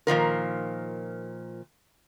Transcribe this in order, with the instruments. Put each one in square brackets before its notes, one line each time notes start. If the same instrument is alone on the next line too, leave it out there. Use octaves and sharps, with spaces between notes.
[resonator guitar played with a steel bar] A#2 D#3 F3 A#4